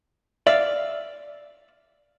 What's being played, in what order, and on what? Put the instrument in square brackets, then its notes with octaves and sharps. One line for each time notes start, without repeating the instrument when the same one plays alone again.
[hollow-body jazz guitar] D5 E5 F5